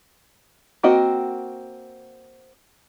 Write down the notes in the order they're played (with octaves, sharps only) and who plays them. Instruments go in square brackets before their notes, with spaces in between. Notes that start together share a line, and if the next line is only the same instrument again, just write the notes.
[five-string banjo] A#3 C4 F#4 D#5